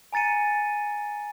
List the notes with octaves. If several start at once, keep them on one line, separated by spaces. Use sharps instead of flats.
G#5 A#5 A6 C#7 D#7